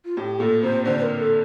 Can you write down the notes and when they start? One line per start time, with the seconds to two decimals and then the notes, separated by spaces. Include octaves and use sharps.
0.05 F4
0.17 A2 G4
0.39 A#2 A4
0.62 C3 C5
0.85 D3 C5
0.98 C5
1.02 A#4
1.19 A4